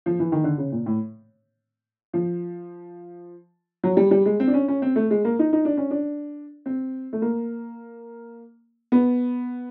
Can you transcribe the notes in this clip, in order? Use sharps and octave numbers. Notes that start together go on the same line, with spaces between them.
F3
E3
D#3
D3
C#3
A#2
A2
F3
F#3
G3
G3
G#3
C4
D4
C#4
C#4
C4
A3
G#3
A#3
D#4
D#4
D4
C#4
D4
C4
A3
A#3
B3